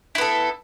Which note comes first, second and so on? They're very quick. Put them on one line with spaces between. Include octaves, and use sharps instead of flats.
E4 B3 A4